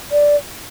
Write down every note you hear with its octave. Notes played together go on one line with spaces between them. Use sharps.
D5